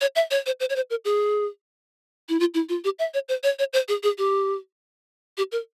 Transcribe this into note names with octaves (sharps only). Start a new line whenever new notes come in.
C#5
E5
C#5
C5
C5
C#5
C5
A#4
G#4
E4
F4
E4
F4
G4
E5
C#5
C5
C#5
C#5
C5
G#4
G#4
G4
G4
A#4